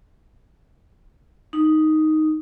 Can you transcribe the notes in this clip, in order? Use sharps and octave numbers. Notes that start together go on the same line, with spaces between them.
D#4